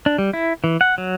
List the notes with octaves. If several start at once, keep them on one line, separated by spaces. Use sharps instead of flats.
D4
G3
E4
E3
F#5
F#3